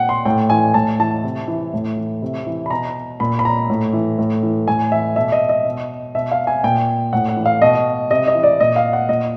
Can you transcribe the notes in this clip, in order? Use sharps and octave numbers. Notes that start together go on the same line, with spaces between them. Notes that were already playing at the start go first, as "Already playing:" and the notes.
Already playing: A#2 F#5 G5
C6
A2 G5
E3 G#5
A2 A5
E3 A5
C3
E3
A2
E3
C3
E3
B5
B2 A#5
A#2 B5
B5
A#5
A2
E3
A2
E3
A2 G#5
E3 E5
B2 E5
D#5
D#5
B2
B2 E5
F5
G#5
A#2 G5
A2 F#5
F#5
E3
F5
B2 D#5
C3 D#5
D#5
E3
D5
A#2 D#5
F5
F#5
A#2 D#5